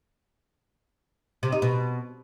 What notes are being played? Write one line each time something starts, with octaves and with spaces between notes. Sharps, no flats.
C3
D#4
B2